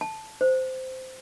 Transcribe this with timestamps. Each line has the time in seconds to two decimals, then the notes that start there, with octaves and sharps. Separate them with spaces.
0.01 A5
0.41 C5